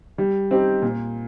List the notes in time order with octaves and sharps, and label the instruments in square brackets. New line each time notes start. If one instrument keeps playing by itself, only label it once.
[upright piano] G3
C4 D#4 G4
A#2